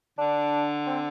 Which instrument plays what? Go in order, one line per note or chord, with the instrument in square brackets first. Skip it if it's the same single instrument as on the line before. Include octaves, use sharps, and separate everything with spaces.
[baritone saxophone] D3 [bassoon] D4
[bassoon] C4